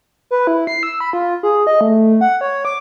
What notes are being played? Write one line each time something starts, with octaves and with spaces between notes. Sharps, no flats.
B4
E4
C7
E6
B5
F4
G#4
D#5
A3
F#5
C#5
D6